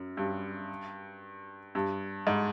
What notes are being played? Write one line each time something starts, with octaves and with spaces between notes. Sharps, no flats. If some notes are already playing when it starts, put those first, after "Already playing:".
Already playing: F#2
G2
G2
G#2